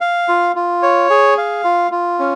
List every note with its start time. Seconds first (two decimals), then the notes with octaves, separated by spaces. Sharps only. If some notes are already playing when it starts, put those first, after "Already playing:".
0.01 F5
0.28 F4
0.56 F4
0.83 C#5
1.10 G#4
1.38 F5
1.64 F4
1.91 F4
2.19 C#4